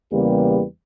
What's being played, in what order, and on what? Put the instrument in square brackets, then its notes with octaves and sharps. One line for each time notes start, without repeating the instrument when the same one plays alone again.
[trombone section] E2 C#3 G3 A#3 G4 B4